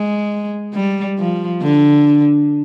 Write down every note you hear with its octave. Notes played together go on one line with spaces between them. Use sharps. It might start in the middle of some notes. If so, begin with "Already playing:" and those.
Already playing: G#3
G3
F3
D3